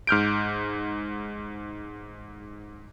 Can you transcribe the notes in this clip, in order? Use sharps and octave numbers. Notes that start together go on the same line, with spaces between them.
G#2 F6 G6 D7